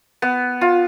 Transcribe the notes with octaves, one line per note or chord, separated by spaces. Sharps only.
B3
F4